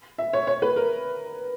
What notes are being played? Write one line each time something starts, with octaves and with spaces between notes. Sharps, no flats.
E5
C#5
C#5
B4
A#4